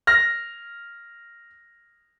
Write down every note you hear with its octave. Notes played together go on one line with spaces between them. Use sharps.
F6 A#6